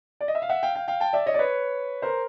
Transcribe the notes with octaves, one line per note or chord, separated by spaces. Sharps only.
D5
D#5
E5
F5
E5 F#5
F5 G5
F5 G5
F5 G5
G5 A5
D5 E5
C#5 D#5
D5
B4 C#5
A#4 C5